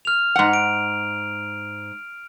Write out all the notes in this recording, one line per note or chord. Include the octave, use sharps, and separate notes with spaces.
F6 F7
G#2 F#5
D7